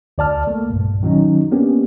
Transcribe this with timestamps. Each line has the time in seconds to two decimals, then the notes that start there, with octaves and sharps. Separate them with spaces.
0.18 D2 D5 A5 F6
0.47 A3 A#3
0.69 C2 G2 A#2
1.03 D#3 F#3 C#4 D#4
1.52 A#3 B3 C#4 D4 G4